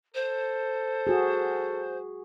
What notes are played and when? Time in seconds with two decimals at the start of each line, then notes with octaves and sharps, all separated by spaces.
0.14 A4 C5
1.07 F#4 G#4